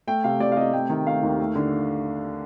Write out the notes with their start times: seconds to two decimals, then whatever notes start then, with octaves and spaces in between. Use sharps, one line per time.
0.07 A3 G5
0.24 C3 F5
0.40 C3 D5
0.52 F5
0.57 C3 D#5
0.73 A3 G5
0.89 D#3
1.06 A3 F5
1.23 D#2
1.39 A3
1.55 D3